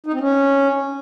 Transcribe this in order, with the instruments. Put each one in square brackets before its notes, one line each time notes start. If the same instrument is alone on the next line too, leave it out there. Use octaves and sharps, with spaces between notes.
[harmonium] D#4
C4
C#4